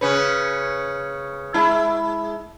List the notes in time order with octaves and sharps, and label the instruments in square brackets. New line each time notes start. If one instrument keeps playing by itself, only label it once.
[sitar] C#3 C#4 B4
G#3 E4